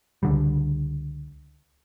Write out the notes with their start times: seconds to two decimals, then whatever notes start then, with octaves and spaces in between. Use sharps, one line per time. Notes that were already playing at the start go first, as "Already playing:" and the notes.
0.23 C#2 D3 G3